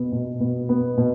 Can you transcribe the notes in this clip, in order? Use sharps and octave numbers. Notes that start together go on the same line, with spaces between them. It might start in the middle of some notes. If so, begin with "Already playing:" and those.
Already playing: B2 B3
B2
B2
B3
B2